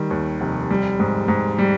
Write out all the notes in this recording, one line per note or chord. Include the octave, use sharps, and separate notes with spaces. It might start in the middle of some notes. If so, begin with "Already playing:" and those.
Already playing: D#3 G3
D#2
F1
G3
G#2
G#2
G3